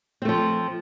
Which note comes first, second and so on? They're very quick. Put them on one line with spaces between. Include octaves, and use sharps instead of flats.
C4 A3 F3